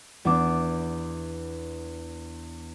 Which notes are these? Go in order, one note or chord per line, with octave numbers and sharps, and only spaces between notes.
E2 B3 D4 D6